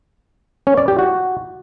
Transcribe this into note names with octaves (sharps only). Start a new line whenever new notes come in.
C#4
D5
G4
F#4